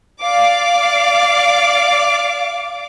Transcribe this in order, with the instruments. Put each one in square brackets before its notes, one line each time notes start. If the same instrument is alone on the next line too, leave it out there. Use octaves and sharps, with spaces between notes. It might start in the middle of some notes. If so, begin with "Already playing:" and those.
[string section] D5 F5 D6